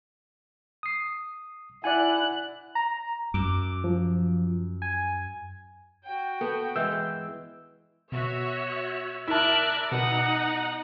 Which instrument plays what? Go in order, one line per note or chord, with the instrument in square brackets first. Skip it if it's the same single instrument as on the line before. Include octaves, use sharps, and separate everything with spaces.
[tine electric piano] D#6 C7
[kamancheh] E4 F#6 [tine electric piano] D5 F#5 G#5
[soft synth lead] A#5
[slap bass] F#2 [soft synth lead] D6
[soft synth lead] F3
G#5
[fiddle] F#4 G5
[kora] B3 [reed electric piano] A4
[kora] E3 G#3 [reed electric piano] E6 G6
[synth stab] B2 [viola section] F#4 C#5 E5
[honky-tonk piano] E4 A5 [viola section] A#4 D5 [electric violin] E5 F#6
[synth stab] B2 [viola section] D#4 [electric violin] F#5